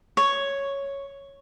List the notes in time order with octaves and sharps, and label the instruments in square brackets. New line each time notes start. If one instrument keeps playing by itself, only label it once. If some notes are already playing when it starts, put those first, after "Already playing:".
[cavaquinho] C#5